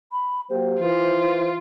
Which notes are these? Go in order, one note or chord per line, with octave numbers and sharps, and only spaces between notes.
B5
F#3 A#3 G4 C5
E3 F4